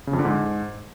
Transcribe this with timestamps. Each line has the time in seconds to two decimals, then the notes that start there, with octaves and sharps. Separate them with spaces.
0.07 C#3
0.13 F2
0.19 D3
0.25 G#2